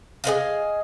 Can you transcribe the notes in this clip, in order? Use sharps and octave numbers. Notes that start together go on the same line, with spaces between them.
G#4 B4 D#5 F5